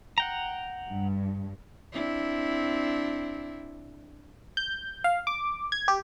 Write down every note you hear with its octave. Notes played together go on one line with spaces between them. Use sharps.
F#5 G5 A#5
G2
C4 D4 E4
G6
F5
D6
G#6
G4